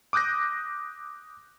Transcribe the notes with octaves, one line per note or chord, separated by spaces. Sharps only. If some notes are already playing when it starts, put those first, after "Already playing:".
D6 D#6 F#6 G6 A#6